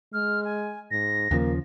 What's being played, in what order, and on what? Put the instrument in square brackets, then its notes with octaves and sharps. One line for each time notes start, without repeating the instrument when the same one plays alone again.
[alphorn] G#3 [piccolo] F6
[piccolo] G#5
[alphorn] G#2 [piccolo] A#6
[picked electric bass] D#2 C#3 F3 [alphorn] A#3